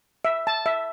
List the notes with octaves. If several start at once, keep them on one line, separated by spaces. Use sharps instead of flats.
E5
A5
E5